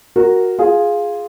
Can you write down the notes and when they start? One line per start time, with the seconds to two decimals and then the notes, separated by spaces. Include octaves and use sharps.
0.16 F#4 A#4
0.59 F4 G#4